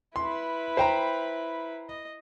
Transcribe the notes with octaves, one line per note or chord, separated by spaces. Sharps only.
E4 B4 C6
C5 G5 A#5
D#5